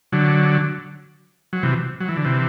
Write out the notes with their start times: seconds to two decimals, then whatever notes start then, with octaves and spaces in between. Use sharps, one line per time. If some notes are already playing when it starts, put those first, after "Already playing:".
0.12 D3 F#3
1.53 F#3
1.63 C3 E3
2.00 F#3
2.09 E3
2.17 D3
2.25 C3 E3